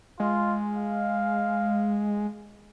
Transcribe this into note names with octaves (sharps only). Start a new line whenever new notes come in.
G#3 F4
F5